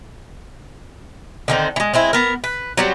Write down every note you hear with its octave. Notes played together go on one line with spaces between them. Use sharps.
D3 D#3 C4
E3 G#3
G#3 C4 E4
B3 A#4
B4
F#3 G3 C4